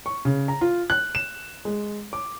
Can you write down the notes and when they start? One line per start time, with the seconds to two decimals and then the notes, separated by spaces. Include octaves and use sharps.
0.06 C#6
0.25 C#3
0.48 A#5
0.61 F4
0.90 F#6
1.15 E7
1.65 G#3
2.13 D6